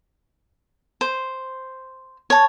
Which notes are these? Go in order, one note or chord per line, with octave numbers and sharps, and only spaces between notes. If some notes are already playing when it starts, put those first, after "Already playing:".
C5
C#5 A5